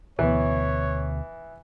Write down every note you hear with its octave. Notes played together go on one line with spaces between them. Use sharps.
D2 B2 E3 B3 C#5